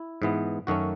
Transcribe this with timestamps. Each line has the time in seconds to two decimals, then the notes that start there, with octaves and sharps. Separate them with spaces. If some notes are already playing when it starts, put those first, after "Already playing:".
Already playing: E4
0.22 G#2 E3 B3
0.67 F#2 D#3 A3 C#4 F#4